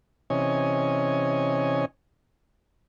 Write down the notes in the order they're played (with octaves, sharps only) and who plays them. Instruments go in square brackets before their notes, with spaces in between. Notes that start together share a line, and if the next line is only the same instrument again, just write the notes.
[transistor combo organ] C3 E3 C#4 C#5 D#5 G#5